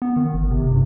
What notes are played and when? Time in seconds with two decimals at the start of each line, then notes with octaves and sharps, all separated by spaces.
0.02 B3
0.16 D#3
0.34 G1
0.51 C3
0.71 G2